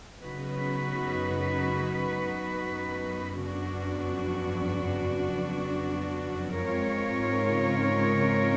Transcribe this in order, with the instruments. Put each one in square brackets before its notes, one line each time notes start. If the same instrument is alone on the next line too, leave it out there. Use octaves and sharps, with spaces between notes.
[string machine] C#3 [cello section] F#3 B3 D#4 F#4 B4
[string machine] F#2
F#2
[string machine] F#2 [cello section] C#3 F#3 B3 D4 F#4
[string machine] F2
G2
F#2
F2
F2
F#2
[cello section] G#3 C4 F4 A#4 C#5
[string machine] G#2
C#3
C#3